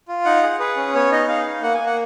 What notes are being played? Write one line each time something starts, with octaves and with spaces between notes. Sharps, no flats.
F4
D#4 F#5
G#4
G#4 B4
C#4
B3 C#5
D#4 D#5
G#4 F5
D#4
A#3 F#5
G#5
A#3
F#5